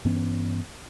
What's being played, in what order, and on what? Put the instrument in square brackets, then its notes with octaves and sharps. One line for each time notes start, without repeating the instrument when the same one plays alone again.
[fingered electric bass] G2 E3 B3 C#4